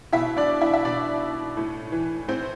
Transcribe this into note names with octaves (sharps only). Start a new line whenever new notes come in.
B2 E4 E5
D4 D5
E4 E5
E5
B2 D4 D5
A2
E3
A2 C4 C5